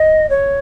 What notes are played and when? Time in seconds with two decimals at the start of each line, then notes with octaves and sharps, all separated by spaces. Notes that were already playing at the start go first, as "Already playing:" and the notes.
Already playing: D#5
0.30 C#5